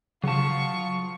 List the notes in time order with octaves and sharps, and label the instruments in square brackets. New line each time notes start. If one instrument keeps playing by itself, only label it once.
[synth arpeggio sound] C#3 [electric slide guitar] F#3 A5 [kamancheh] F4 C#6